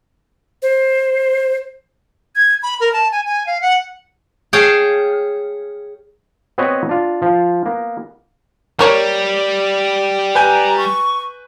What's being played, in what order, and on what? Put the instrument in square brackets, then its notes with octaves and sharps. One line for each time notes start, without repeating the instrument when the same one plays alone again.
[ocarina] C5
[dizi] G#6
B5
A#4
A5
G#5
G#5
F5
F#5
[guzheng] G#4 C#5 F5 G5 A5
[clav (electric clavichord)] B3 C4 F#4 B4 C#5 D#5
D4 F4
F3 F4
A#3 B3
[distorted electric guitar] G3 [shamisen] A#3 A#4 C#5
[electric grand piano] B4 G#5 G6 [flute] A#5
[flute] C#6